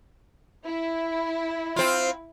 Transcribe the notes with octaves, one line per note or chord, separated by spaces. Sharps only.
E4
C4 F4